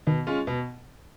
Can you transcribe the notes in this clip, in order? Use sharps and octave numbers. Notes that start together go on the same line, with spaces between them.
B2 D#3
G#3 C#4 F4
B2